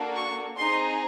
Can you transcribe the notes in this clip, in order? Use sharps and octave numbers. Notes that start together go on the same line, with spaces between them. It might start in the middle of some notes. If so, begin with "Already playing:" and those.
Already playing: A#3 D4 F#4 A4
C#6
C4 D#4 G#4 C6